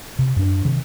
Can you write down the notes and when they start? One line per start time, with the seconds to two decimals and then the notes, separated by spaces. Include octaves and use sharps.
0.19 C3
0.36 F#2 D4
0.65 C3 D#3